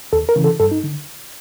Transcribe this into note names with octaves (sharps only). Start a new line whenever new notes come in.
D#2 A4
A#4
C#3 E3
A4
G2 A4
D#4
D3